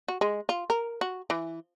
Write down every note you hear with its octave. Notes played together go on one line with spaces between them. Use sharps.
F#4
G#3
F4
A#4
F#4
E3